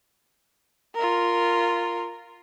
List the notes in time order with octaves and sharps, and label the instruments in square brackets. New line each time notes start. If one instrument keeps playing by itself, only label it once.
[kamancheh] F4 A#4